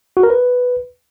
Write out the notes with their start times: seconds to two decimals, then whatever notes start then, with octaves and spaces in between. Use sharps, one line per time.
0.17 F#4
0.23 A#4
0.30 B4